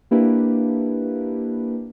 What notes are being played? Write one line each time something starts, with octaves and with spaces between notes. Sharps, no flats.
A#3 D4 E4 G4 B4